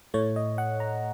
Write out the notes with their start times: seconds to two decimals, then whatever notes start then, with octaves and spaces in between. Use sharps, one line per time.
0.14 A2 A3 C#5
0.36 D#5
0.58 F#5
0.80 A#5